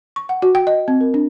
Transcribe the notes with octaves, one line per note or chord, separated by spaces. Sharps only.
C#6
F#5
F#4
G5
D#5
C4
A#4
D4